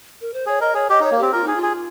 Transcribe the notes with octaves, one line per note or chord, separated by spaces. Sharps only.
A#4
C5
G#4 C#5
A#4 D#5
G#4 C#5
G4 D#5
D#4 C#5
A#3
C4 G4
F4 A#4
D#4 G#4
F4
G#4